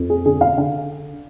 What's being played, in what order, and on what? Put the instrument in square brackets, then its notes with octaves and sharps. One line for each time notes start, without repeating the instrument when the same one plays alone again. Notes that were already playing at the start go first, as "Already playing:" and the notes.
Already playing: [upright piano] F2
G#4
D3 G#4
F5
D3 F5